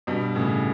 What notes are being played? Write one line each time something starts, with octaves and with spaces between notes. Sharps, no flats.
G2 B2
A2 C#3